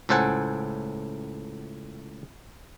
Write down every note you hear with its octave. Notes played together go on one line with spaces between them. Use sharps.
C#2 A2 A4 C5 F#5 G#5